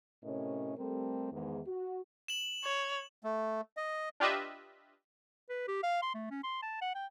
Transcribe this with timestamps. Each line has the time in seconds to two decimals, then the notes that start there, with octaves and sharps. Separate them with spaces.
0.23 A2 C3 C#4 A#4 C#5 D#5
0.78 G3 A3 C4 G4 A4 A#4
1.31 E2 G#2 D#3
1.66 F#4
2.28 E7 F#7
2.64 C#5
3.24 A3
3.77 D#5
4.20 D4 F4 G4 B4 D#5 E5
5.49 B4
5.68 G4
5.83 F5
6.02 C6
6.14 A3
6.30 C#4
6.44 C6
6.62 A5
6.81 F#5
6.95 G5